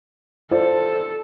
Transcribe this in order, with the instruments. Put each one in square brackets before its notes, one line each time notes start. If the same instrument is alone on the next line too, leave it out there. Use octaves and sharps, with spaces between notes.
[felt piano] F4 C5 D5 [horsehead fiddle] A4